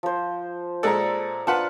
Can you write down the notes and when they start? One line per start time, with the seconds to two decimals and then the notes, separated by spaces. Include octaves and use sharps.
0.03 F3 C5
0.83 A#2 G#3 A4 D5 E5 A#5
1.47 D4 F4 B4 F#5 A5